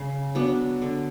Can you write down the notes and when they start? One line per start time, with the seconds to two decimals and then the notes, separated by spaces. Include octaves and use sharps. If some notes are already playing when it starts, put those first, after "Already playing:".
Already playing: C#3
0.35 F#3 B3 D4
0.82 D3